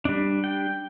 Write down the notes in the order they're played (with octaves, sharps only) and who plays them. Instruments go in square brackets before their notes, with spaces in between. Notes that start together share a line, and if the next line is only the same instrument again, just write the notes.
[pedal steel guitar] G3 D4
G5